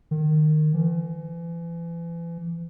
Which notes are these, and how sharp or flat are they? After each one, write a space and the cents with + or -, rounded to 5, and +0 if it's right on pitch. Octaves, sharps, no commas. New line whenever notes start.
D#3 -20
E3 +35